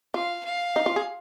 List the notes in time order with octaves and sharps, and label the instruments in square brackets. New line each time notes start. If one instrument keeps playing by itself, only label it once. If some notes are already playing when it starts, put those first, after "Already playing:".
[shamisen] F4 [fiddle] F5
[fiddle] F5
[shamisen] D#4
F4
G#4